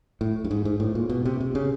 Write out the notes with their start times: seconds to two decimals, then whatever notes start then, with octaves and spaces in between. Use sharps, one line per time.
0.21 A2
0.44 G2
0.51 G#2
0.65 G#2
0.80 A2
0.95 A#2
1.10 B2
1.25 C3
1.40 C3
1.55 C#3